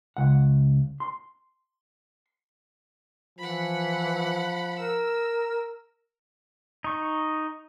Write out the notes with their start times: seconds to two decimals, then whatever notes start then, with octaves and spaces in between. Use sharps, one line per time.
0.17 C#2 F#5
1.00 C6
3.39 E3 F3 F#5 B5
4.79 A#4 E6
6.84 D#4 C#6